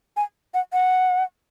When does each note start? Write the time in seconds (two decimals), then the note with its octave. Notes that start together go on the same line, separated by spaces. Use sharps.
0.17 G#5
0.54 F#5
0.73 F#5